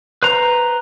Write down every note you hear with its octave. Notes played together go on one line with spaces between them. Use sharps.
B4 C5 A#5